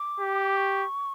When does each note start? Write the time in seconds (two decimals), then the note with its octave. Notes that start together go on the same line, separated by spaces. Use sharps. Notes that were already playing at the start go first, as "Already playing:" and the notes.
Already playing: D6
0.20 G4
0.56 C#6